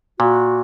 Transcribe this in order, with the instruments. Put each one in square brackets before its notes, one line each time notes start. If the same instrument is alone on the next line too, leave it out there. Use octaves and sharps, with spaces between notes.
[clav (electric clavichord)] A#2 [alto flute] F#4